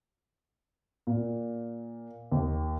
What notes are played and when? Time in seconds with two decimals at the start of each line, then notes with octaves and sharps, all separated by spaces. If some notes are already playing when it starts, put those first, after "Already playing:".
1.07 A#2
2.32 D#2